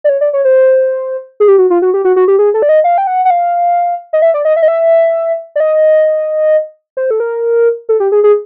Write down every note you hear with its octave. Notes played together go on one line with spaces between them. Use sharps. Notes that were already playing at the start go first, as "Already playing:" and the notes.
D5
C#5
D5
C#5
C5
G#4
G4
F#4
F4
F#4
G4
F#4
F#4
G4
G#4
A4
D5
D#5
F5
G5
F#5
F#5
F5
D#5
E5
D5
D#5
E5
D#5
E5
D5
D#5
C5
A4
A#4
A4
G4
G#4
G#4